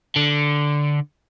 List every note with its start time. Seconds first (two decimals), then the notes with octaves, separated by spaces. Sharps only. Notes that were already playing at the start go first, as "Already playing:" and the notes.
0.16 D3